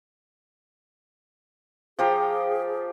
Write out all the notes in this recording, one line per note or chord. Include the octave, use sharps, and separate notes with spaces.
F3 G4 G#4 A#5